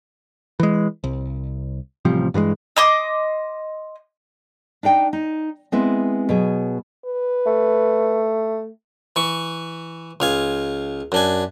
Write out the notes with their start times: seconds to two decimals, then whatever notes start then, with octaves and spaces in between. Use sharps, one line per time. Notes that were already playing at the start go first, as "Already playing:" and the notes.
0.60 E3 G#3
1.04 C2
2.05 A1 C3 F3 G3
2.34 G2 E3 F3 G#3
2.77 D#5 C6 D6
4.83 D4 D#4 D5 G5
5.13 D#4
5.72 G#3 B3 C4 E4
6.29 B2 F#3 G#4
7.05 B4
7.46 A3
9.16 E3 C#6
10.20 C#2 F5 G#5
11.12 F#2 D4 G#5